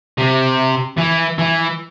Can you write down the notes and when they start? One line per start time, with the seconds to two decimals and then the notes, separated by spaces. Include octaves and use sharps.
0.18 C3
0.98 E3
1.38 E3